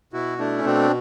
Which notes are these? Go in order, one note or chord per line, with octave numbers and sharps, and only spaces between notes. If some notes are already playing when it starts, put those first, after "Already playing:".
B2 E4 F#4
A3 D4 E4
C#4
B2 C4 D4